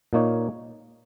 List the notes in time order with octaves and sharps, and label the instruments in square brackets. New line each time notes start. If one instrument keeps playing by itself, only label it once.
[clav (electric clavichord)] A#2 A#3 D#4 C#5